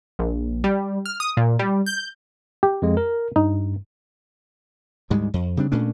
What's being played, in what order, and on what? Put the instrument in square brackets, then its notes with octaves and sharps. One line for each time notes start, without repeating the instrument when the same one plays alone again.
[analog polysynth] A#1
G3
F6
D#6
A#2
G3
G6
[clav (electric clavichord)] G4
[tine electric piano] F2 G#3
A#4
[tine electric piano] G2 [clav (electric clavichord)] D#4
[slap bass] D2 G#2 G3 G#3
F2
C#3 G3 C4 D4
A#2 A3 C#4 D4